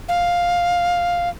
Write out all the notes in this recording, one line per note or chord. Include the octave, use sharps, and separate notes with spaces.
F5